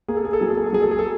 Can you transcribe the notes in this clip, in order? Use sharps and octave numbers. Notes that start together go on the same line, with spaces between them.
A#3 G#4
A4
G#4
A4
F#3 G#4
A4
G#4
A4
F#3 G#4
A4
G#4
A4